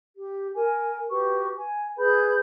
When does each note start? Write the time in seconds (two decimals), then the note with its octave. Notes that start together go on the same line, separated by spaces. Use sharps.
0.15 G4
0.54 A#4 G#5
1.08 F#4 G4 B4 C#6
1.57 G#5
1.97 G#4 B4 B5 G6